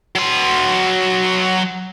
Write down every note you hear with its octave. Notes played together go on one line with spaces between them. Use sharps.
F#3 C6